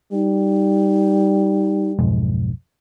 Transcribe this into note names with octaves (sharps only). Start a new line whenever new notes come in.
G3 D#4
B1 F2 G#2